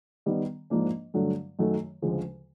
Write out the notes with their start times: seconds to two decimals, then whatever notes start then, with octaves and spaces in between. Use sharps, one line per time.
0.26 D#3 G3 B3
0.70 G#2 F3 A#3 D4
1.14 G2 D3 F#3 A3
1.59 F#2 D#3 F#3 A3
2.02 D2 C#3 F3 G#3